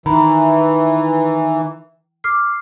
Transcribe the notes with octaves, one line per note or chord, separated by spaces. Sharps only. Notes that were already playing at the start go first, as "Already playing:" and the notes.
D#3 E3 A#5 B5
D6 F6 C7